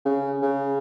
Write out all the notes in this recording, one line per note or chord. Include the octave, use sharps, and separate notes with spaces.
C#3
C#3